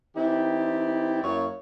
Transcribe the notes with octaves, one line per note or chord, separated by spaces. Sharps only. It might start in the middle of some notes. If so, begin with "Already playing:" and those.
E3 C4 D#4 E4 G4 D5
F#2 A#3 E4 C#5